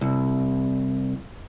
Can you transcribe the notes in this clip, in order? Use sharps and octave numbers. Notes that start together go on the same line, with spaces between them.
C2